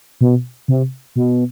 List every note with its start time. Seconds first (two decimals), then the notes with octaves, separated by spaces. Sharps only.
0.21 B2
0.68 C3
1.16 B2